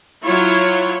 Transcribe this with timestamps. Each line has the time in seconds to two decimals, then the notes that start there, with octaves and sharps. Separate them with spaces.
0.24 F#3 E4 F4 C#5